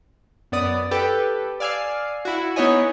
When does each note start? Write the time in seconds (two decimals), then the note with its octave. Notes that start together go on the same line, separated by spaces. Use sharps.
0.52 F#2 B3 D5 D#6
0.91 G4 A4 B4 G5
1.60 D5 F5 G#5 E6 F6 C7
2.25 E4 F#4
2.56 B3 D#4 E4 C#5 D#5 G#5